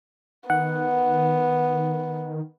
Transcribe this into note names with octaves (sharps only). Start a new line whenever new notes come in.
D#3 B3 F#5